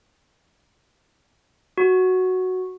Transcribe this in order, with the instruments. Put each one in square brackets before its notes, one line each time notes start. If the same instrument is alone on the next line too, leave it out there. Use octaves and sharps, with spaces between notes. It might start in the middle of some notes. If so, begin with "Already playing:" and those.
[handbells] F#4